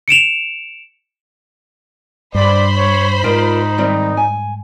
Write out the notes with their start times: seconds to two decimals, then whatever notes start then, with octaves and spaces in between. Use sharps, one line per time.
0.08 C#7 D7 E7 F7
2.35 G2 C5 D5 B5
2.76 C#5
3.24 G#2 D#4 F4 A#4 D5
3.78 D#3 G3 C4
4.17 G#5